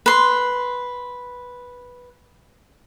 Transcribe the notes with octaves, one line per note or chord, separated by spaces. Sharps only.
B4 C6